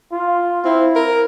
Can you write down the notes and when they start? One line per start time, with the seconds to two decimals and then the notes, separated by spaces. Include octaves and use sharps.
0.11 F4
0.65 C4 E4
0.96 A#4